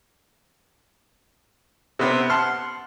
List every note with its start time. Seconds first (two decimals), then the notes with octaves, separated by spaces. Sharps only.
1.99 C3 B3 C4
2.30 F#5 A5 C6 F6